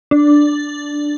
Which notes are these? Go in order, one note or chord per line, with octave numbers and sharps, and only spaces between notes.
D4